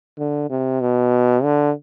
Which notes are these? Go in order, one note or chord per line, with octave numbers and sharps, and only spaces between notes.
D3
C3
B2
D3